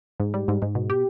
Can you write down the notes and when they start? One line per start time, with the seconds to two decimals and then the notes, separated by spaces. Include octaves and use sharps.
0.20 G#2
0.34 G3
0.48 G#2
0.62 G#2
0.75 B2
0.90 G4